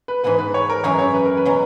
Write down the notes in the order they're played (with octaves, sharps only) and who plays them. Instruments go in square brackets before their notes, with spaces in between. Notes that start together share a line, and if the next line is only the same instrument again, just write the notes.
[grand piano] B4
[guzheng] G#2 E3 B3 [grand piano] B4
[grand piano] B4
C#5
A#4
[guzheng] F#2 E3 G#3 [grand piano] C#5
[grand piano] C#5
B4
A#4
B4
[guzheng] B2 F#3 C#4